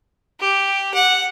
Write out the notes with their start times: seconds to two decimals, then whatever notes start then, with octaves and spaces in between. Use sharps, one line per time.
0.40 G4
0.94 F#5